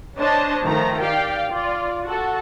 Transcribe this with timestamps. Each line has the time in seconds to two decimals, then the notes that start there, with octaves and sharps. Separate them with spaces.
0.19 D4 C5 C#5 D#5 A5
0.64 D#3 F3 A3 A#5
1.01 G4 D5 F5 G5
1.50 F4 D5
2.06 F#4 A4